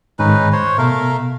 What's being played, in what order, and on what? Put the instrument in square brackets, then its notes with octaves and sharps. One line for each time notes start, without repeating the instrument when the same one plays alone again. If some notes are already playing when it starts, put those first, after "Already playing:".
[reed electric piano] G#2 D#3 [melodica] C#4 D#4 B4
[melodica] C5 C#5
[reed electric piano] B2 [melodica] A3 A#4 F5